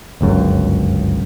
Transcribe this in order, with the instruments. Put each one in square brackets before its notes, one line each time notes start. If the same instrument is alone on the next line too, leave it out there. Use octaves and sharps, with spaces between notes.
[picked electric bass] G1 C#2 F#2